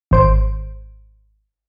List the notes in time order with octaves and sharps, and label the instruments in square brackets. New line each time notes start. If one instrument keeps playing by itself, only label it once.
[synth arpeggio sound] G#1 C5 D7